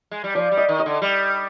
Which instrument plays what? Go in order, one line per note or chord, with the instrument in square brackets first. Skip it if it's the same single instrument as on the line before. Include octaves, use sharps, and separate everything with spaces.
[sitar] G#3
G3
[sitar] F3 [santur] D5
[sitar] G3
[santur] D#5
[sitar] D#3
[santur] D#5
[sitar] D3
G3